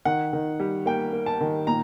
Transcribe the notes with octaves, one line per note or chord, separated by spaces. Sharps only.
D#3 F#5
D#3
G3
A#3 G5
A#3
A5
D#3
A#2 A#5